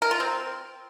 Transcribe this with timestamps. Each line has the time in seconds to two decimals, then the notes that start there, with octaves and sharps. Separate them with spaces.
0.02 A#4
0.11 F4
0.20 C4